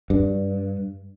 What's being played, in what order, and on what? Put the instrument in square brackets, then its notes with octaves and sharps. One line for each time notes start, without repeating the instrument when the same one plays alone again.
[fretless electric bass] G2